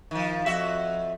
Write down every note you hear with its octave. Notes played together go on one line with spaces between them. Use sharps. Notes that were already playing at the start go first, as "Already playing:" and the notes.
D#3 F3
F2 F#4 E5